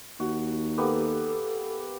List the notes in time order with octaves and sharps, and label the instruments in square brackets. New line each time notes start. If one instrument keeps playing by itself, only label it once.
[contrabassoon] D#2 [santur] F#4
[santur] A#3 B3 G4 [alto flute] A4